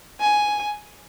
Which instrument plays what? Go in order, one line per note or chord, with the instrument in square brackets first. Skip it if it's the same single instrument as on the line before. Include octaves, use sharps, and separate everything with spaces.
[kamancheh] G#5